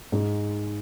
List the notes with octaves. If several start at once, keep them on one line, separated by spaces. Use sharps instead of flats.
G#2 G#3